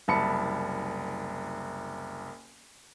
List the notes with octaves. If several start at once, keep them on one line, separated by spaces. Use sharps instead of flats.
F#1 C2 A5 B5 C#7